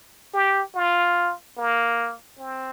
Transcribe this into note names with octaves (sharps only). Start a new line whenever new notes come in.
G4
F4
A#3
C4